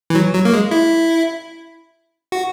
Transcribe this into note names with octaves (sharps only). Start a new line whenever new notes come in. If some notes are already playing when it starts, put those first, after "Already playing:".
E3
F#3
F#3
A#3
G#3
E4
F#4